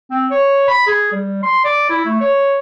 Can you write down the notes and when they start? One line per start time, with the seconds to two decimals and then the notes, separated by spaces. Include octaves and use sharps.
0.11 C4
0.31 C#5
0.68 B5
0.87 G#4
1.12 G3
1.43 C6
1.65 D5
1.90 E4
2.06 A3
2.21 C#5